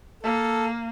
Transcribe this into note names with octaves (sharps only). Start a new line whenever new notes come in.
A#3 A4